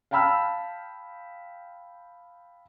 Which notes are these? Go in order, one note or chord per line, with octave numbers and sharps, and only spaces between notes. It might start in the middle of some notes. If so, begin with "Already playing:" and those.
F5 G5 A5 B5 E6 F6